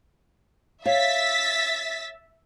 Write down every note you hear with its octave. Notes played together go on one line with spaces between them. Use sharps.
C#5 E5 F5 A6 B6